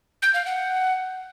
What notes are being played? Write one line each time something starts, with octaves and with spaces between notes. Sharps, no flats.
G6
F5
F#5